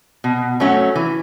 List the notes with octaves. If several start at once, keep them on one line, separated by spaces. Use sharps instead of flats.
B2
F#3 A3 C#4 F#4
E3